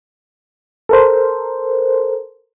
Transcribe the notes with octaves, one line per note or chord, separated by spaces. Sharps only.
A4 A#4 C5